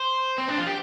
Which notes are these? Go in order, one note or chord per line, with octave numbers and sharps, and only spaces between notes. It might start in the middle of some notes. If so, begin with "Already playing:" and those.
Already playing: C5
C4
D4
F4
G4